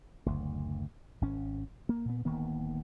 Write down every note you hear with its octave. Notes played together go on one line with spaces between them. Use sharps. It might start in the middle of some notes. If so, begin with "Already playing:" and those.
F#1 D2
G#1 C#4
A#3
A#2 B3
D1 D#3 A#3 B3